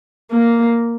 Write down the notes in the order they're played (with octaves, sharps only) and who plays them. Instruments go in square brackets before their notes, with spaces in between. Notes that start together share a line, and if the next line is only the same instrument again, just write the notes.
[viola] A#3